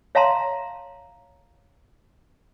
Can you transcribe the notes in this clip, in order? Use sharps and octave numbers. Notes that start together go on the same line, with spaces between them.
C#5 E5 F5 A5 A#5 C6